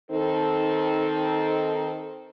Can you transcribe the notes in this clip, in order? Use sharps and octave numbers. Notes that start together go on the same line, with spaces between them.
D#3 C4 D#4 A4